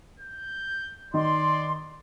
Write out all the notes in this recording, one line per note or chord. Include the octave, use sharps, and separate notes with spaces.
G6
D#3 D5 C6